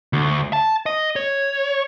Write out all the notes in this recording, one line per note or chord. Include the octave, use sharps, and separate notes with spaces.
D2
A5
D#5
C#5